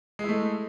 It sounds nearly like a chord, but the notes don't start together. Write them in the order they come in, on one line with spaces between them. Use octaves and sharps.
G#3 E4 A3